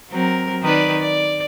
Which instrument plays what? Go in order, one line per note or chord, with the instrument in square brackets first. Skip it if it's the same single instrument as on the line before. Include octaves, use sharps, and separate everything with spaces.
[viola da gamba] F#3 C4 A#4
D#3 B4 D5
D5